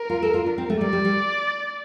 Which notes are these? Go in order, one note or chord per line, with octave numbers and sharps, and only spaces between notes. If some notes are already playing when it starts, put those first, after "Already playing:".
Already playing: A#4
F4
A4
F4
D4
C4
A3
G3 D5
G3
G3